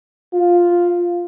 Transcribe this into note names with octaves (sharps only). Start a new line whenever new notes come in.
F4